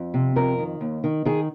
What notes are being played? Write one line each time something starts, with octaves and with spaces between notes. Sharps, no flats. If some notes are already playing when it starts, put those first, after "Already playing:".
Already playing: F2
C3
F2 A#4
D#3
D#2
D#3
D#3 G#4